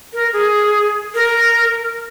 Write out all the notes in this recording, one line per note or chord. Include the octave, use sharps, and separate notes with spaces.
A#4
G#4
A#4